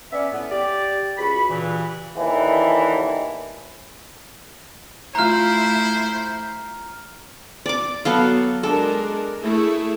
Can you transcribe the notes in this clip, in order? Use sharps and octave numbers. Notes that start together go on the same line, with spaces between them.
B3 C#4 D5 E5
A2 B3
G4 D5
C#2 F#4 B5
G2 A#2 C#3 E3
D#2 D3 E3
A3 E4 F4 C5 A#5 F6 F#6
D5 D6
F#3 B3 A4 F5
G#3 D4 A4 A#4
A3 E4 G#4